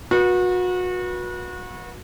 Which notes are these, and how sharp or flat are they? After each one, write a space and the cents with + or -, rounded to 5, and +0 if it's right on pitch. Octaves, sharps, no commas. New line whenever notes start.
F#4 -30 B4 -35